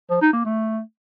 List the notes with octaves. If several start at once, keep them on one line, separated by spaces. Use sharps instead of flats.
F3
D#4
A#3
A3